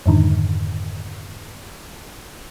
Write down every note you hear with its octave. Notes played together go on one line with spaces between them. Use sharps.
F2 G#2 D3 D#3